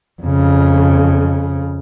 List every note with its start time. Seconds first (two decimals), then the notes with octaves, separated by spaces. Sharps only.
0.23 F2 C#3